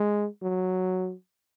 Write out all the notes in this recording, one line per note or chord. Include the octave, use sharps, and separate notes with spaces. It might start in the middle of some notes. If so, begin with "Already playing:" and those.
Already playing: G#3
F#3